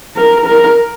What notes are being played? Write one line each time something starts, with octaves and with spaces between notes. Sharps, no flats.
A#4
A#4